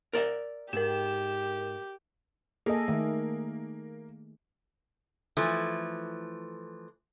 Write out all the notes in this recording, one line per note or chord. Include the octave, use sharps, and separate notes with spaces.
A#4 D5 E5
G#2 G4 A#4 E7
A#3 G#4 A4 D#5
D#3 A3
E3 F3 A3